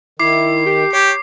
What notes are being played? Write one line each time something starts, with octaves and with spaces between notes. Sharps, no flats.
D#3 E4 D6 C7
G4
G4 C#5